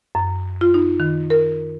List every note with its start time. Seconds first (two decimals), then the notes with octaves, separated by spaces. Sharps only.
0.15 F#2
0.61 F4
0.74 D#4
1.00 D#3
1.30 A#4